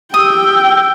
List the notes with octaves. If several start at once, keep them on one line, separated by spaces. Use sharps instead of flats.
G4 G5 D#6 E6